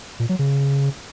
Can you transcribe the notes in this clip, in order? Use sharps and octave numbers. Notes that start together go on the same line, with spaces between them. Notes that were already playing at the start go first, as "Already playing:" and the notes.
A#2
F#3
C#3